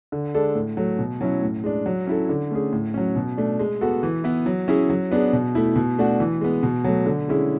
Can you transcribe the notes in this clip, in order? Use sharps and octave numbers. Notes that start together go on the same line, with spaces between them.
D3
G#3 D4 A4
A2
F#3 A3
B2
F#3 C#4 E4
A2
G#3 D4
F#3
C#4 E4 A4
D3
A3 C#4 G#4
A2
F#3 C#4
B2
A3 D4
G#3
B3 F#4 A4
E3
B3 E4
F#3
C#4 E4 G#4
F#3
B3 D4 G#4
B2
A3 E4
B2
A3 D4 F#4
E3
G#3 B3
B2
F#3 A3
D3
G#3 C#4 E4 G#4